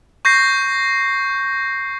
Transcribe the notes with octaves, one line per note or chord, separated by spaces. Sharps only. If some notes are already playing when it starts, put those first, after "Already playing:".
C#6 G6 A#6 C7